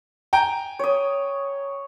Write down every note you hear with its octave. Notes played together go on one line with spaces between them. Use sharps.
G5 G#5 A#5
C#5 D#6